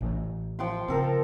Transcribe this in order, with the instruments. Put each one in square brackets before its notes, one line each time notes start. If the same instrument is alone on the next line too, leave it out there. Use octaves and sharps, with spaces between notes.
[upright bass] A1
[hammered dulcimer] F3 G5 C6
[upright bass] C#3 [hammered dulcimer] C4 A4 A#4